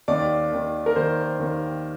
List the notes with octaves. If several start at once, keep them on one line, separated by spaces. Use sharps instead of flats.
D#2 D#3 D5
D#2 D#3
A#4
D#2 D#3 C5
D#2 D#3